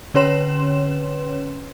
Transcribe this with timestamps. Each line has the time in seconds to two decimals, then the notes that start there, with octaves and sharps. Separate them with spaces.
0.14 D3 C#4 B4 C#5 C6 E7